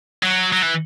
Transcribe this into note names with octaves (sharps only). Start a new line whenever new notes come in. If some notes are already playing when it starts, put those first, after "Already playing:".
F#3
F#3
E3